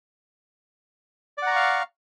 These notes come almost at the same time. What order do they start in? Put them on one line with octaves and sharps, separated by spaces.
D5 F#5 A#5 C#6 F5